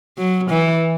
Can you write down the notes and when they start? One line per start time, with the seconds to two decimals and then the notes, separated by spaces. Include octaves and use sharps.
0.18 F#3
0.50 E3